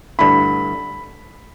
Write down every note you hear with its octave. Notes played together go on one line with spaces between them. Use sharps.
G2 D3 A3 E4 B5